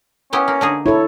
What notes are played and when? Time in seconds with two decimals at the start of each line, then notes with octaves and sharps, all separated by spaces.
0.33 B3 C#4 E4 G4
0.48 A#3
0.61 D3 D#4 G#4
0.86 E4 A4 C#5